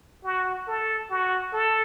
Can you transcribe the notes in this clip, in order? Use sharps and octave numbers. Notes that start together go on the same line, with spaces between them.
F#4
A4
F#4
A4